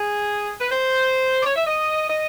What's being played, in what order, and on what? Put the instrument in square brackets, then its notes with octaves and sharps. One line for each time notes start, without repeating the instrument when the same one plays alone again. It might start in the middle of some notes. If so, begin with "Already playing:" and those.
Already playing: [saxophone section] G#4
B4
C5
D5
C#5
E5
D#5
D#5